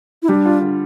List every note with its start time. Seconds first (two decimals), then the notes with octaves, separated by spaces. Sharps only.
0.23 E4
0.28 G3 D4
0.46 F4
0.61 D3